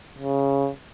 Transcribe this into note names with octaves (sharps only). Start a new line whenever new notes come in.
C#3